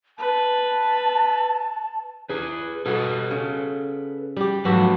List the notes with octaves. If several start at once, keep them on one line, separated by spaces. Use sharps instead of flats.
B4 A5
G#4 B4
B2 A4 B4 F#5
C#3
G3 G4
G#2 F3 F#3 F#4 G4 A4 B4